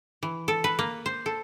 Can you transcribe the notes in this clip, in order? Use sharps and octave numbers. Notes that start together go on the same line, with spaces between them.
E3
A4
B4
A#3
C5
A4